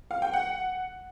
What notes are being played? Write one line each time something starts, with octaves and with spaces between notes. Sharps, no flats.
F5
G5
F#5